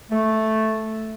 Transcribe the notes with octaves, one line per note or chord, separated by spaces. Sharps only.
A3